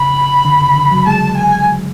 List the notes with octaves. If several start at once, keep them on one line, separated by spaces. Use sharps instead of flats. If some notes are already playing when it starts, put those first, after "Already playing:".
Already playing: C#3 B5
D3
C#3
D3
F#3
G#3 A5
G#5